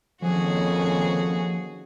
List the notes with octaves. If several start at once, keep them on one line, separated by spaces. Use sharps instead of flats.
F2 D#3 F3 A#3 C#4 F#4 G#4